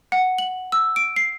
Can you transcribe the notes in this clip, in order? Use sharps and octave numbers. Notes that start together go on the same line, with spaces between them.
F#5
F#7
E6
D7
C7